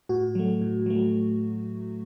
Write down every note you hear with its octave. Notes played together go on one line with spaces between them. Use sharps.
A2 F#4
F#3 A3
A2
F#3 A3